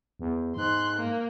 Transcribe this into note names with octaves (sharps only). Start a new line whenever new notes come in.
E2
G#2 C6 F#6
A#3